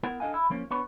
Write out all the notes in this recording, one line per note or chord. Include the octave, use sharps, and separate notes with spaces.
B3 E4 A#4 F#5
D4 A4 D#5 F5 G#5
E4
F3 A#3 C#4
B3 D4 B4 C#5